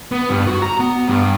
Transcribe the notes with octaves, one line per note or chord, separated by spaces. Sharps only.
B3
G2
F#4
A#5
B3
G2